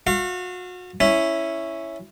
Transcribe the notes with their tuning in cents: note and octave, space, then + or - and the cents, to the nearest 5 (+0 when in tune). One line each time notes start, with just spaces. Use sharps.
F#4 -35 F5 -30
C#4 +0 E4 +0